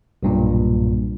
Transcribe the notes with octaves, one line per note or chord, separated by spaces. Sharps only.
B1 G2 A#2